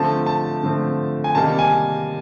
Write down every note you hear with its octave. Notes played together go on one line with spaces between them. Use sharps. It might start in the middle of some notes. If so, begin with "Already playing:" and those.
Already playing: D3 F3 A3 C4 A5
A5
D3 F3 A3 C4
G#5
C3 D#3 G3 A#3 A5
G#5